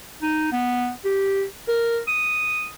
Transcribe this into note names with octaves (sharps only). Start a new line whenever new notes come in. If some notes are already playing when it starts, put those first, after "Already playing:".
D#4
B3
G4
A#4
D#6